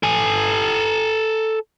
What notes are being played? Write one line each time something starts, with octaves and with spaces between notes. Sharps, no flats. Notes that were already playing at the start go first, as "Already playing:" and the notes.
A4 G#5